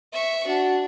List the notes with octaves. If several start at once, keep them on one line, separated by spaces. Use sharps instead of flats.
E5 C#6
D4 F#4